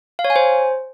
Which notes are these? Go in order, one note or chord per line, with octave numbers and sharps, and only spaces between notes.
F5
C#5
G#5
C5